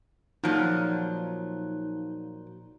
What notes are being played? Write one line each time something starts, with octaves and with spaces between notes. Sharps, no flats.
A#2 F3 F#3 D#4